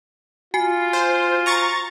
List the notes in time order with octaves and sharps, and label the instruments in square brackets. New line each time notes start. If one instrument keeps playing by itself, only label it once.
[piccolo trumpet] F4 [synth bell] F#4 G#5 C7
[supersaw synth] C5
A#5 C#6 A6